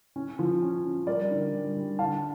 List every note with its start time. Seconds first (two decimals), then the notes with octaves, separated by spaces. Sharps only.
0.16 C#4
0.39 F3
0.62 C#4
0.85 C#4
1.07 G3 A#4 D5
1.31 D3
1.53 G3
1.76 G3
1.99 D3 F5 A5